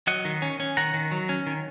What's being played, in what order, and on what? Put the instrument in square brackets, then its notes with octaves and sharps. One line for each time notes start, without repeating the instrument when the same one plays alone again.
[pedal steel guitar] F#3 D#5 F#5
D#3
C#4
C#4
D#3 F#5 A#5
D#3
F#3
C#4
D#3